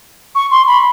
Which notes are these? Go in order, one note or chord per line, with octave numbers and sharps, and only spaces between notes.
C#6
C6
B5